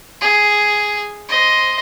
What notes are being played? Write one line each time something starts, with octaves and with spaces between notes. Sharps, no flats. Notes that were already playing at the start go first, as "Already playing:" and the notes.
G#4
C5 D#5